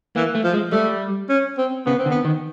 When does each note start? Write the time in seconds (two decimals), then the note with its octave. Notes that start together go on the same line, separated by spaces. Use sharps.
0.16 E3 A#3
0.35 A3
0.44 F3
0.53 G#3
0.72 G3 A3
1.29 C#4
1.57 C4
1.86 C#3 B3
1.98 C4
2.06 D3
2.11 B3
2.25 D#3